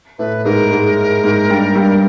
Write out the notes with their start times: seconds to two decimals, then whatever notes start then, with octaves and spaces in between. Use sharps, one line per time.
0.19 A2 A3 B4
0.45 G#2 G#3 A#4
0.71 G#2 G#3
1.24 G#2 G#3
1.49 G2 G3
1.75 G2 G3